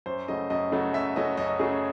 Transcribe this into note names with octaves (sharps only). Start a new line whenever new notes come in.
F#2 C5
C#3 F#3 A3 D#5
F#2 D#5
C#3 F#3 A3
F#2 E5
C#3 F#3 A3 D#5
F#2 D#5
D#5
C#3 F#3 A3 G#4